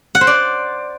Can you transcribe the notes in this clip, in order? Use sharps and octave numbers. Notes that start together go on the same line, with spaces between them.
F#5
C5
D5